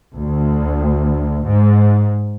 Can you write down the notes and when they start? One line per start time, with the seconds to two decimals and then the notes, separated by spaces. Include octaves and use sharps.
0.16 D2
1.44 G#2